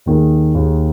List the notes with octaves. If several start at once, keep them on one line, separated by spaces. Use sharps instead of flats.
D#2 D#3 A#3 G#4
D#2 D#3 A#3 G#4